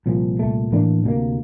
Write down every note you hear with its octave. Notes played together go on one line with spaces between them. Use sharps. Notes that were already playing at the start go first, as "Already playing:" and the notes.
C2 A#2 F3
C2 A#2 A3
A2 E3 A#3 D4
D2 C3 G3 A#3